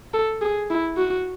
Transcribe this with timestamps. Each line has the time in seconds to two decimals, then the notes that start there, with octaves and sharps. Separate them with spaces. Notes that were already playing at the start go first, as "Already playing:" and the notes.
0.14 A4
0.42 G#4
0.70 E4
0.97 F#4